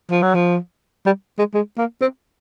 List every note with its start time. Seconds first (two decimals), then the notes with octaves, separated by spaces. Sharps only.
0.11 F3
0.22 F#3
0.34 F3
1.06 G3
1.39 G#3
1.54 G#3
1.78 A#3
2.02 C4